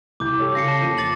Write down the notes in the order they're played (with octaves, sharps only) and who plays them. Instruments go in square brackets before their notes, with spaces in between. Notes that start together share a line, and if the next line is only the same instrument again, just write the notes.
[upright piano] C2 G6 [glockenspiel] D6
[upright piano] G4 A4 C#5
[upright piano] C#3 [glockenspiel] A#6 C7 C#7
[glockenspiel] A5
[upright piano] F2 A#3 D#7
[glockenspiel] D6 A6 F#7